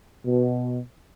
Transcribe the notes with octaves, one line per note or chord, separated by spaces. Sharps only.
B2